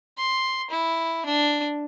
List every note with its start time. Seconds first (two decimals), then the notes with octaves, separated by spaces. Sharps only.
0.18 C6
0.71 E4
1.26 D4